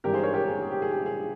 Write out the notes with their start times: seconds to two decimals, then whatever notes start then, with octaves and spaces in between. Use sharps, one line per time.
0.04 G#1 G2 E3 G4 A#4
0.14 G#4 C5
0.23 A#4 C#5
0.34 G4 A#4
0.48 G#4
0.62 G#4
0.72 G4
0.82 G#4
0.91 G4
1.06 G#4